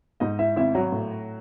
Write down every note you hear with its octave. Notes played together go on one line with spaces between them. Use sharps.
G#2 D#4 D#5
E4 E5
G#1 E4 E5
F#3 F#4
A2